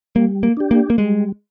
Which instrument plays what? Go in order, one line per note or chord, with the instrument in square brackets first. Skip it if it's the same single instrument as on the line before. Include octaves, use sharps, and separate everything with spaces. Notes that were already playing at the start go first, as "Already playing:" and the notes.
[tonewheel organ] G3 [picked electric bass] A#3
[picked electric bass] A#3
[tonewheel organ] D4 G4
[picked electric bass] A#3
A#3
[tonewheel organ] G3 [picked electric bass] G#3